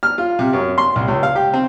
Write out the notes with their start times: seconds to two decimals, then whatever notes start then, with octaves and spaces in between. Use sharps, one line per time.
0.03 F6
0.18 F4
0.39 C3
0.53 F#2
0.78 C6
0.96 C2
1.08 C#2
1.23 F5
1.36 G4
1.54 C4